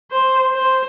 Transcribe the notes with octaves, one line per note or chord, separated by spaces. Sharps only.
C5
C5